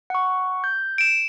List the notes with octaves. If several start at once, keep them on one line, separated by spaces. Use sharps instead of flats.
F#5 C#6
G6
D7 E7